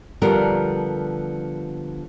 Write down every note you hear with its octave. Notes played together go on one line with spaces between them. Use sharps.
D3 F3 G3 B3 A4 A#4